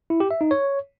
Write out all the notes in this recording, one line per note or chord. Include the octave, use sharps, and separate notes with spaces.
E4
G4
E5
D#4
C#5